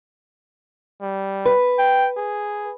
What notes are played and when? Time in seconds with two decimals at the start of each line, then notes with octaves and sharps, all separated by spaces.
1.02 G3
1.45 B4
1.79 G5
2.17 G#4